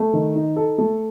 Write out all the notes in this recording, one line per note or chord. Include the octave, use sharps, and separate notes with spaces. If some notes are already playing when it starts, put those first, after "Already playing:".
Already playing: A3
D#3
D#4
A4
A3